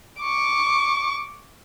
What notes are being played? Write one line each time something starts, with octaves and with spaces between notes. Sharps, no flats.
C#6 D6